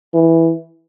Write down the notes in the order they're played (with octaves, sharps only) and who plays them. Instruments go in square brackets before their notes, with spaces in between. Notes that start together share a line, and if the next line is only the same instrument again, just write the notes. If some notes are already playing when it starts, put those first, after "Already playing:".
[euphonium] E3